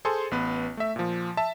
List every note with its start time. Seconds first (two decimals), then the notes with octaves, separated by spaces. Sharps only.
0.05 G#4 A4 C5 G#5 C6
0.31 A1 B3 B4
0.77 A3 E5
0.96 A#2 F3
1.37 E5 A5